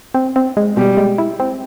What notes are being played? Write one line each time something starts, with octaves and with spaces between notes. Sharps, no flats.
C4
C4
G#3
B2 G3
G#3
E4
C4